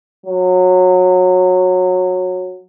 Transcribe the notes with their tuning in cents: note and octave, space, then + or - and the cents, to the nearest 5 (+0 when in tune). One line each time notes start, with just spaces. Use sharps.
F#3 -20